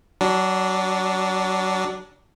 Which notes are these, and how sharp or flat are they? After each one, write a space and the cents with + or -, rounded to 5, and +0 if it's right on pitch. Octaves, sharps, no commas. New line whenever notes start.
F#3 +25 D4 -5